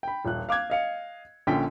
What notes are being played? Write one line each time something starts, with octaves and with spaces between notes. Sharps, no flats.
G5 B5
D#1 A#1 F#6
F5 D6 F#6 G#6
D#5 F5 C#7
A#1 D3 C#4 G5 B6